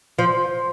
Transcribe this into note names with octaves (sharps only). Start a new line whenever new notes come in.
F3